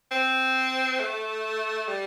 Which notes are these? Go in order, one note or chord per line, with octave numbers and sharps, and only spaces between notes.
C4
A3
G3